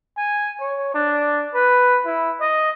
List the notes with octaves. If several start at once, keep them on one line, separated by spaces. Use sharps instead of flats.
G#5
C#5
D4
B4
E4
D#5